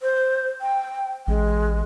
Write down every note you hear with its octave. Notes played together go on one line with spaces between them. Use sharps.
C5
G5
A1 G#3